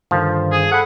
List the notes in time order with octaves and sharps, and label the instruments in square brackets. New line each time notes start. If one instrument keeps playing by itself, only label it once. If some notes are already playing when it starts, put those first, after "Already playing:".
[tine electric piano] G2 D3 D#3 [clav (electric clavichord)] F3
[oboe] G#4
[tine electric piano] A4 B5 [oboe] F#5